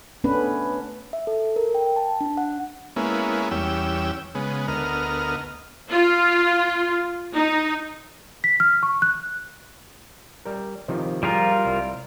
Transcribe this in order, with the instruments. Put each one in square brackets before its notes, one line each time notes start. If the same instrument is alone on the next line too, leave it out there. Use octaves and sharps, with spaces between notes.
[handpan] A3 B3 C#4 D4 B4
[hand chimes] E5
A4
A#4
G5
A5
D4
F#5
[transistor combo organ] G#3 A#3 B3 C#4 E4
E2 G3 C#4 G5 E6
C#3 G#3 B3
D2 B3 A#4 D#5 F6
[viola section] F4
D#4
[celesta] B6
F6
C#6
F#6
[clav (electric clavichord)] G3 A#4
C3 D#3 F3
[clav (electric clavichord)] F3 G#4 A#5 [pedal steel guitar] G3 F4 A#4
[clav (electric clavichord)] C2